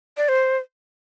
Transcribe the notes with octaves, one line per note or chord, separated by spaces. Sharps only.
D5
C5